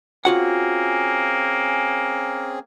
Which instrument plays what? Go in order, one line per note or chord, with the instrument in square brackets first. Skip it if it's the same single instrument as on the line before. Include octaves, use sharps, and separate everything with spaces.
[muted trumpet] A#3 [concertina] C4 C#4 G#4 [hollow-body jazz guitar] F4 F#4 F#5